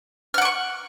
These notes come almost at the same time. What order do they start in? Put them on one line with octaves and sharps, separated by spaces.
F6 F#5 D6 C#6